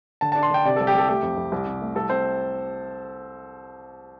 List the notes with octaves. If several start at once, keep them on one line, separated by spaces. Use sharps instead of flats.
D3 A5
D4 A5
C6
D3 G5
C3 D5
C2 A4
G4
C2 A4
A3 G4
F2
F2
C2
C3
A3
C2 A4
C4 C5